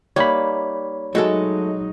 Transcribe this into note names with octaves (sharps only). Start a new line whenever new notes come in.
G3 A#3 D#4 C#5 B5
F#3 G#3 A3 D#4 F#4 A4